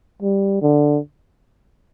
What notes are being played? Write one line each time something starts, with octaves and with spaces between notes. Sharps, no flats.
G3
D3